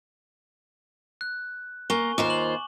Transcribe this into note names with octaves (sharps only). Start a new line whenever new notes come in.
F#6
A#3 G#5 C#6 G7
D#2 F4 C5 D6
F#7